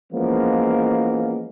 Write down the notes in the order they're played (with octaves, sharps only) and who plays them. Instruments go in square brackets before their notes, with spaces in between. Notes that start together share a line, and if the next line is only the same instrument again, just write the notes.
[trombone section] E3 F3 G#3 A#3 B3 C#4